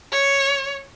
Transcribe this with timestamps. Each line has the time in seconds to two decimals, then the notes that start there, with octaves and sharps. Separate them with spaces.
0.12 C#5